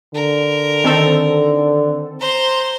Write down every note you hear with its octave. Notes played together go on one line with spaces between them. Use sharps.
D3 A#4
D#3 C4 A4
C5 A#5 C6